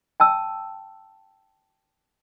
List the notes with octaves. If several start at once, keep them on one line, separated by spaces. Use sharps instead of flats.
G5 A5 E6